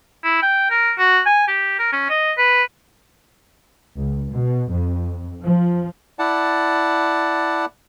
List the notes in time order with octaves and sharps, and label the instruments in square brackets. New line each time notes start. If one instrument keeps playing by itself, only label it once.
[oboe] E4
G5
A#4
F#4
G#5
G4
A#4
C#4
D#5
B4
[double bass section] C#2
B2
F2
F3
[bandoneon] E4 D5 F#5 A5